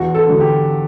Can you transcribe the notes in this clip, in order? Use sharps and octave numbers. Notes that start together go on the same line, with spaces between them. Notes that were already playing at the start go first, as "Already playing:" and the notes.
Already playing: E2 F#4
A4
D3 F#3
G4